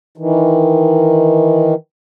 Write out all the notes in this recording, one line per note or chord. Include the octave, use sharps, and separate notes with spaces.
D#3 E3